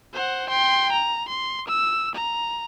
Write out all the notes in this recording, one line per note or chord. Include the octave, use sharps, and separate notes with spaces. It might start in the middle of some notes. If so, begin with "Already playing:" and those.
C5 F#5
G5 C6
A#5
C6
E6
A#5